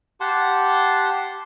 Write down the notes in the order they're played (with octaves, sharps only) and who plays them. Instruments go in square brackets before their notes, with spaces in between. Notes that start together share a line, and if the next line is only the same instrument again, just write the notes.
[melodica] G4 F#5 A5 C6